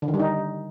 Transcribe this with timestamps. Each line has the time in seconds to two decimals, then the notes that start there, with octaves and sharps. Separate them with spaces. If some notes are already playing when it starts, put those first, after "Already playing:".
0.02 D3
0.08 D#3
0.14 G3
0.20 D#4